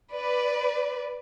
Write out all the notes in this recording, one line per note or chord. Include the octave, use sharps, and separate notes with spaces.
B4 D5